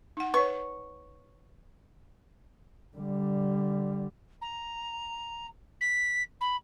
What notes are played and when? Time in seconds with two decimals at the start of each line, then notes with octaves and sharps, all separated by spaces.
0.17 D#4 F#5
0.34 B4 C#5 C#6
2.97 D3 G3
4.42 A#5
5.81 B6
6.41 B5